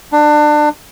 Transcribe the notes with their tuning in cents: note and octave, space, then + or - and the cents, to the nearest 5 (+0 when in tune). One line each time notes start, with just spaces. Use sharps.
D4 +25